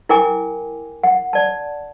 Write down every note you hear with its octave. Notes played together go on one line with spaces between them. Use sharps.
E4 A#4 G5 G#5 D6
F#5
D5 A5